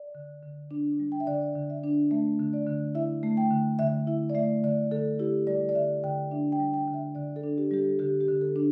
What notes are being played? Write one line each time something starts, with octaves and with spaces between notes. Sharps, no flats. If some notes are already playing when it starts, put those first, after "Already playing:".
Already playing: D5
D3
D3
D4
G3
G5
E5
D3 D5
D3
E5
D4
A3 E5
D3
D5
D3
E4 E5
A3
G5
D3
D3 E5
E4 E5
D5
A3 E5
D3 D5
D3 A4
E4 G4
G3 D5
D5
D3 E5
D3 G5
D4 E5
G5
G3
G5
D3
E5
D3 D5
A4
D4
G4
G3 G4
A4
D3 G4
G4
D3
A4
D4